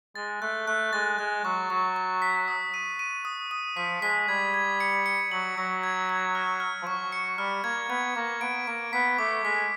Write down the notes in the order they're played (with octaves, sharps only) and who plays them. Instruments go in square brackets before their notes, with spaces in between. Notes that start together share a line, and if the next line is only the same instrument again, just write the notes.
[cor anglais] G#3 [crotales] A6
[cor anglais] A3 [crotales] F#6
[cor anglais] A3 [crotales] F#6
[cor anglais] G#3 [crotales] A6
[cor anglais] G#3 [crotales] F#6
[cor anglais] F#3 [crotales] C#6
[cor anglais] F#3 [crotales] C#6
[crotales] C#6
B6
D#6
D#7
D#7
D#6
D#6
[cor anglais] F3 [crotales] B6
[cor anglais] G#3 [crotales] B6
[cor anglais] G3 [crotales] G#6
[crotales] G#6
C#7
C#7
[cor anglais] F#3 [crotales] F#7
[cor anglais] F#3 [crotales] C#7
[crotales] G#6
G#6
F6
F6
[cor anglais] F3
[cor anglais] F#3 [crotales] C#6
[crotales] C#7
[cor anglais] G3 [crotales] F6
[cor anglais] A#3 [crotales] G#6
[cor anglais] B3 [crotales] G#6
[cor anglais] A#3 [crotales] C#6
[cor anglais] B3 [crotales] D7
[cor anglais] A#3 [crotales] D7
[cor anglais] B3 [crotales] B6
[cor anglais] A3 [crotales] D6
[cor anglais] G#3 [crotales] B6